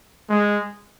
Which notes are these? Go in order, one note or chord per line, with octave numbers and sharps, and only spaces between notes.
G#3